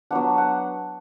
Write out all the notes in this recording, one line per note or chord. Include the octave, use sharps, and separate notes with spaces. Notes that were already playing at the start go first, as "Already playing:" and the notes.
F#3 B3 D4 F#5
F#5